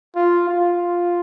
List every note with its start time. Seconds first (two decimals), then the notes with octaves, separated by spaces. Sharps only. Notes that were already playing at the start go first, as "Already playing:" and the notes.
0.16 F4
0.49 F4